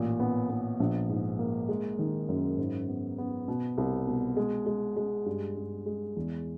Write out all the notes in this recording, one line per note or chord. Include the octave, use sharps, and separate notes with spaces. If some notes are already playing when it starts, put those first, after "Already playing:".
Already playing: A1 A#2
B3
B3
A#1
G#2
A#3
G#3
D#3
F#2
G#2
B3
B3
B2
C2
B2
G#3
G#3
G#3
G2
G2
G#3
E2